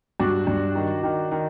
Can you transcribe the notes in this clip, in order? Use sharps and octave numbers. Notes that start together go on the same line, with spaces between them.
G2 D4 F#4
G2
D#3
D#3
D#3